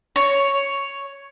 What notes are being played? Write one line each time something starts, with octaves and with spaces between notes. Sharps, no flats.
C#5